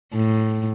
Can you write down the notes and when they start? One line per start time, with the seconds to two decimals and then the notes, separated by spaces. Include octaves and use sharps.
0.14 A2